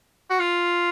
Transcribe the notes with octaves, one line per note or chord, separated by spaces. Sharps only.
F#4
F4